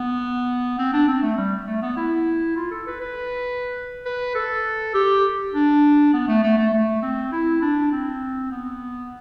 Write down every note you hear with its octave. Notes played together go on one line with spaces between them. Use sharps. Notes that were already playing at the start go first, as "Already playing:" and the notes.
Already playing: B3
C4
D4
C4
A3
G3
A3
B3
E4
F4
A4
B4
B4
B4
A4
G4
D4
B3
A3
A3
A3
A3
C4
E4
D4
C4
B3